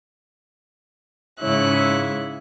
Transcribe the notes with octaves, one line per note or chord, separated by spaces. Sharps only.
G#2 C#3 E4 C#5 F#6